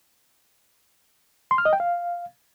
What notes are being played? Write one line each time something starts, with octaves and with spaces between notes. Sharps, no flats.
C6
F6
D#5
G5
F5